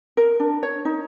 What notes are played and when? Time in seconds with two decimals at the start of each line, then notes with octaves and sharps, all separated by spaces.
0.17 A#4
0.40 D4
0.63 C#5
0.85 D#4